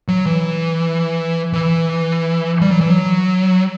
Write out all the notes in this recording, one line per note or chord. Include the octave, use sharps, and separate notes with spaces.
F#3
E3
E3
G3
F#3
E3
F#3